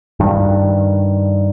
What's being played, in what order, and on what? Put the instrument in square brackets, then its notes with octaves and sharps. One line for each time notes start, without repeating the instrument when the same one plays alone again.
[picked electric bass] G2 D#3